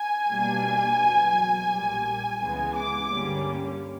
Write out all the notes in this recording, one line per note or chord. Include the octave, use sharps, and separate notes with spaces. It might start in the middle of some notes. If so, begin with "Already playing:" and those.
Already playing: G#5
B2 G3 A#3 D4
E2 B2 F#3
A#1 A#2 G3
C#2 C#3 E3 G#3 B3 G#5
D6
G2 D3 G3 A#3 C#4